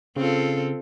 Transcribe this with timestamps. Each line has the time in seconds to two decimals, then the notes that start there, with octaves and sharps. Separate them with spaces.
0.16 C#3 C4 F4 A4